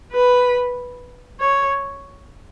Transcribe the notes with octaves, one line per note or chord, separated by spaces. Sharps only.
B4
C#5